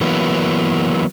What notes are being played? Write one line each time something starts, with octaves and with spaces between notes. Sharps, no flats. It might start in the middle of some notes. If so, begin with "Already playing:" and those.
E3 F#3 A#3 B3